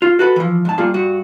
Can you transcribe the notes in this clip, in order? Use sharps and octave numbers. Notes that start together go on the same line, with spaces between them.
F4
F#4 A4 B4
E3 F3
G#2 A5
G3 A#3 F4 G#4
G2 F#4